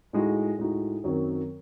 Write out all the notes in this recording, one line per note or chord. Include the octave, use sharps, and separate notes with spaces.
A2 G#3 D#4 F#4
A2 G#3 D#4 F#4
F#2 D#3 F#3 C4